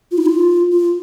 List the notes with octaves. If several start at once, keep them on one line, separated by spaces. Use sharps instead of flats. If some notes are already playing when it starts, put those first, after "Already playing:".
F4
D#4
F4
F4